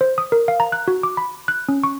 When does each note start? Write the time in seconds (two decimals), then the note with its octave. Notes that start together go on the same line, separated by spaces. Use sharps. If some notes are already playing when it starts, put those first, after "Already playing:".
0.01 C5
0.18 D#6
0.32 A#4
0.48 F5
0.60 A#5
0.72 F#6
0.88 F#4
1.03 D6
1.17 B5
1.48 F#6
1.69 C#4
1.84 C#6